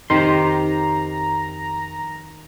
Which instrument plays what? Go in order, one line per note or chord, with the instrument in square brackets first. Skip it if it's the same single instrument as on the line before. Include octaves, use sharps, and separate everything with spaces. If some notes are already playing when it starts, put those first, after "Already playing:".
[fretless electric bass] F2 C4 [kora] D#3 [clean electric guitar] G4 C5 C6 [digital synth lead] A#5